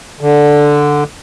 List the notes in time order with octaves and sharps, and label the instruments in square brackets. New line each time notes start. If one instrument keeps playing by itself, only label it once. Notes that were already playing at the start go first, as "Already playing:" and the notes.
[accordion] D3